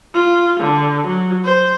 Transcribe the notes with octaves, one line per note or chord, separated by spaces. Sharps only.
F4
D3
F#3
C5